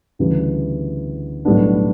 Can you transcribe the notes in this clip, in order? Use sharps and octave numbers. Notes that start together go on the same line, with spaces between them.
D2 C#3 E3 G3 D4
B1 A2 G3 B3 D4